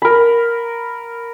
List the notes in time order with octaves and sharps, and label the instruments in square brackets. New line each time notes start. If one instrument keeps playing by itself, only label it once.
[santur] A#4 B5